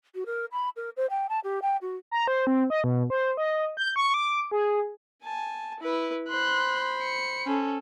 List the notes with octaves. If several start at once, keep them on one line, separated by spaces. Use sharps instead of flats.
F#4
A#4
B5
A#4
C5
G5
A5
G4
G5
F#4
A#5
C5
C4
D#5
B2
C5
D#5
G6
C#6
D6
G#4
G#5 A5
E4 B4
C5 B5 C6 F#6
C#7
C#4 A4